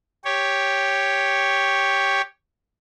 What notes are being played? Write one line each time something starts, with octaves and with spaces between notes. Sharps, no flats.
G4 C#5